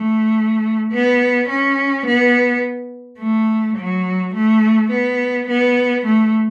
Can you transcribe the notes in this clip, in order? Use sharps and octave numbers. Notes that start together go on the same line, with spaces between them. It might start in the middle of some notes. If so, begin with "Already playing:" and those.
Already playing: A3
B3
C#4
B3
A3
F#3
A3
B3
B3
A3